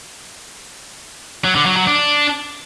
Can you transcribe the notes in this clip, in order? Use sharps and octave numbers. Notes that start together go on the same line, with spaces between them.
F#3
D3
F#3
F#3
D4